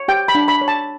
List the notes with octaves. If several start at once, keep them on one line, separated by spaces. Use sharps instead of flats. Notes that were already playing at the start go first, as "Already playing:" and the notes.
Already playing: C#5
G4 G5
B5
D4
B5
C#5
A5